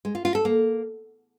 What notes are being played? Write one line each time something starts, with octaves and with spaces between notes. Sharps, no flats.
G#3
F4
F4
A4
A#3